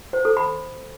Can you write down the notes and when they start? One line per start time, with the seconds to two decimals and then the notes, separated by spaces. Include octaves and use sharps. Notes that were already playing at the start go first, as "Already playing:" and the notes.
0.13 C5
0.25 A4
0.37 B5